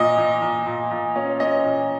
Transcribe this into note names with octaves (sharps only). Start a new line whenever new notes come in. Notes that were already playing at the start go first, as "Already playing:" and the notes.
Already playing: A#2 D#5
A#2
A#2
A#2
A#2
C#4
C#4 D#5
A#2